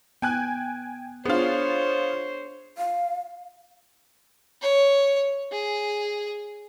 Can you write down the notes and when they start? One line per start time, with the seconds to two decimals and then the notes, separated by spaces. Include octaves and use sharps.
0.22 B3 G5 G#5 F#6
1.25 B3 D4 F4 G#4 C5 C#5
2.78 F5
4.62 C#5
5.52 G#4